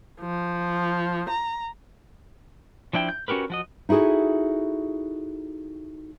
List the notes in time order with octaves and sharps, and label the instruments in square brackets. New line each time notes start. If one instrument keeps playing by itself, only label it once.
[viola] F3
A#5
[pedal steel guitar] F3 D4 E4 G5
G6
C#4 F#4 G4 A#4 B4
F3 F#4 D#5
[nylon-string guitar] D#4 E4 F#4 G#4 A4